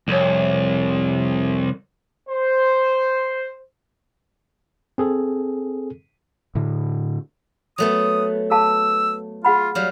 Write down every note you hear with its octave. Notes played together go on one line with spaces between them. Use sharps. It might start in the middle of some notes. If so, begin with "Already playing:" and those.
C2 F2 C#5
C5
C4 G#4 A4
A2 D3
F#3 A3 B3 D#6
A4 F5 A5 E6
F4 G#4 F#5 B5
F#3 G3 F5